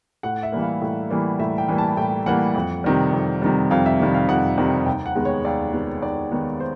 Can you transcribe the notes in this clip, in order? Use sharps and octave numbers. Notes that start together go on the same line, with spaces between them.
A2 F#5
E5
E3 G3 A#3
F5
A2
E3 G3 A#3
A2 E5
G5
E3 G3 A#3
A5
A2 G5
E3 G3 A#3 F#5
F2
C3 D#3 G3
F2
C3 D#3 G3
F2 F5
E5
C3 D#3 G3
F5
F2 F#5
C3 D#3 G3
D#2 G5
F#5
D#3 G#3 B3
C#5
D#2 D5
D#3 G#3 B3
D#2 D5
D#3 G#3 B3
C5